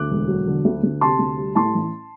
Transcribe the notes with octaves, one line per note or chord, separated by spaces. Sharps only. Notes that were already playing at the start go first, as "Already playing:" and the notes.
Already playing: D2 D6 F#6
E1
F#3
D3
D2
D2
C3 A5 C6
D2
G3
A2 A5 C6
A1